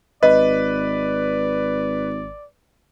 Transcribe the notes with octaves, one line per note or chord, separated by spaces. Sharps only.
G#1 B4 D5 D#5